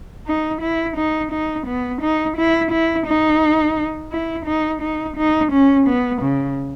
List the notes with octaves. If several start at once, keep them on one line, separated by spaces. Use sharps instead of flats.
D#4
E4
D#4
D#4
B3
D#4
E4
E4
D#4
E4
D#4
D#4
D#4
C#4
B3
C#3